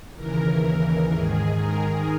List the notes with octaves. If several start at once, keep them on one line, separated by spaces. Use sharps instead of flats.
D#2 C#3 E3 A#4
G#2 D#3 G#4
A#4